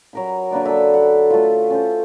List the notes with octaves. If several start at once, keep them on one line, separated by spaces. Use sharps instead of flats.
F#3 A#4 B5
D3 A#3 B4 D5
A4 E5
F#5
A3 F4
C#4 C5